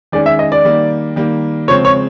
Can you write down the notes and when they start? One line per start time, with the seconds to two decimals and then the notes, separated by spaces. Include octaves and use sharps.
0.12 D#3 G#3 C#4 D5
0.26 E5
0.39 D#5
0.52 D5
0.64 D#3 G3 A#3
1.16 D#3 G3 A#3
1.68 C#3 F3 G#3 C4 C#5
1.85 C#5